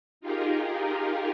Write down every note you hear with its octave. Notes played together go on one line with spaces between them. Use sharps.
D#4 F4 G4 G#4 A#4